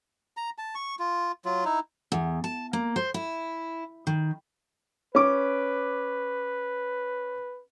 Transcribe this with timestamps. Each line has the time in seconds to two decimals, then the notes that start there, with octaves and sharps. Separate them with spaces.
0.37 A#5
0.58 A5
0.75 C#6
0.99 F4
1.45 F#3 F4
1.65 D#4 E4
2.12 E2
2.44 A5
2.73 A#3
2.96 C5
3.14 E4
4.07 D#3
5.15 C#4 B4 D6